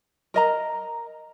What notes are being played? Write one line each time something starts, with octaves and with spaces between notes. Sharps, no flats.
A#4 D#5 A#5